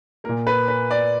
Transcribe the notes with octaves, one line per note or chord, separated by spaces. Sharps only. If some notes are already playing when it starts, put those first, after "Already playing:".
A#2 A#3 A#4
B4
B4
D5